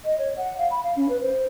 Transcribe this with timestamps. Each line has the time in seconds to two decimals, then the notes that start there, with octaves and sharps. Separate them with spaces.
0.04 D#5
0.18 C#5
0.36 F#5
0.57 F5
0.70 B5
0.83 F5
0.96 C#4
1.09 B4
1.21 C5